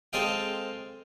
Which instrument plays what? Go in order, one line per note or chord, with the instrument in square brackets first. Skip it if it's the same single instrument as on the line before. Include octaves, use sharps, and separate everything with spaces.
[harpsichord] G#3 C4 A4 D#5 F5 G5